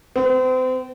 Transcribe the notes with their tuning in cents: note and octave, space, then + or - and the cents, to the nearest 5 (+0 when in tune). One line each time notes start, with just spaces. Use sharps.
C4 -35